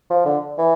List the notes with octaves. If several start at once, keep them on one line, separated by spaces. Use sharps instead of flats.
F3
D3
E3